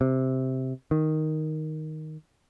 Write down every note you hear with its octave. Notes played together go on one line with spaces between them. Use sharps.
C3
D#3